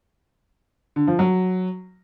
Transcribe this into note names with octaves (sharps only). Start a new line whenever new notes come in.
D3
F3
F#3